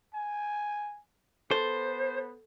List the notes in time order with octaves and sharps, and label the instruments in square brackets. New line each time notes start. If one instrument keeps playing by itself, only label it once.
[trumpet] G#5
[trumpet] B3 [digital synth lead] A4 [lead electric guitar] C5